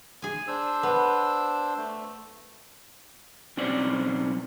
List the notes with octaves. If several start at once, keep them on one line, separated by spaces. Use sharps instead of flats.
G#4 G#5
D4 C5 E6
B3
A3
B1 C4 C#4 C5 D5